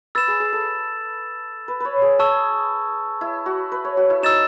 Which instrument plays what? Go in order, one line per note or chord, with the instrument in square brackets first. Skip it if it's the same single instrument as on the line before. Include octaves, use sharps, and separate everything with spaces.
[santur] B4 [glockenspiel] E6 A6 E7
[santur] G#4
G#4
A4
B4
B4 C#5
G#4
[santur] G#4 [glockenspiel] A5 C#6 E6
[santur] E4
F#4
B4
C#5
F#4
E4
[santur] D#4 [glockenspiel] E6 A6 E7